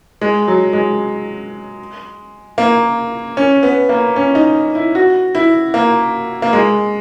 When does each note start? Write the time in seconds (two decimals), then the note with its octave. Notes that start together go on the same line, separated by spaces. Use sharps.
0.21 G#3
0.48 F#3
0.73 G#3
2.58 A#3
3.37 C#4
3.63 B3
3.89 A#3
4.16 C#4
4.35 D#4
4.75 E4
4.95 F#4
5.35 E4
5.74 A#3
6.42 A#3
6.53 G#3